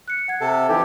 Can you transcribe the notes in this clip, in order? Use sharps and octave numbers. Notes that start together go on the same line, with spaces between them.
F#6 C#7
F#5 G#6
C3 A4
F2 E3 D#4 G4 A4